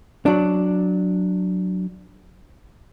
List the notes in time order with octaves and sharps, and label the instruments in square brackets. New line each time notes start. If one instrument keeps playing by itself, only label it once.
[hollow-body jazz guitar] F#3 D4